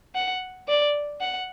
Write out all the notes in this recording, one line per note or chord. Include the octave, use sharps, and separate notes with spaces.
F#5
D5
F#5